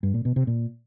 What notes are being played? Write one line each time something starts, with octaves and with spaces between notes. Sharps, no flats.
G2
A#2
B2
C3
A#2